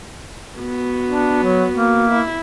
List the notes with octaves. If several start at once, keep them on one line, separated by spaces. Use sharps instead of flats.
B3 F#4
D4
F#3
A#3
E4